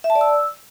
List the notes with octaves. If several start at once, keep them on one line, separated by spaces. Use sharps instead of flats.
E5
A5
D5
E6